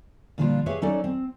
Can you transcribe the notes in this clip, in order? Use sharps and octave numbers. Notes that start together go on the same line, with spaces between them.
A#2 D3 F3 G3 D4 F4
G4 G#4 B4 C#5 E5 F5
F#3 C#4 D#4 A4 D5
C4